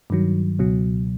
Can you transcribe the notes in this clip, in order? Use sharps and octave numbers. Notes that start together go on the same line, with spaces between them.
G2 D#3 F#3
C#2 B2 F#3